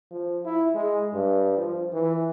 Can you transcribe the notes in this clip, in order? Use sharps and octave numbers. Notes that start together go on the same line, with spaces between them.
F3
E4
G#3
G2
F3
E3